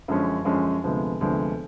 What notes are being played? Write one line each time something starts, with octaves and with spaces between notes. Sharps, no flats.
F#2 D3 F3 G#3 C#4
F#2 D3 F3 G#3 C#4
D2 C3 F3 G#3 B3
D2 C3 F3 G#3 B3